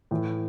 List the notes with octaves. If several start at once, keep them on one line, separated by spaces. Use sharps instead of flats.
A2 E3